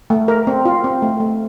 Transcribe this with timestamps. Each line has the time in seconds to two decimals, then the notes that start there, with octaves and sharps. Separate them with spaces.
0.10 A3
0.28 A#4
0.47 C4
0.65 F4
0.84 C4
1.02 A3
1.20 A3